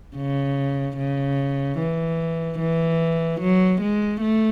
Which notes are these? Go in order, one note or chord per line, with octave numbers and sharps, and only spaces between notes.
C#3
C#3
E3
E3
F#3
G#3
A3